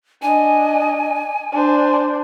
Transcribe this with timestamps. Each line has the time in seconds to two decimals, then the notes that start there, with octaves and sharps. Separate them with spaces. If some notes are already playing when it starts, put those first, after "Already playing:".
0.22 D4 D#5 G#5
1.53 D4 C5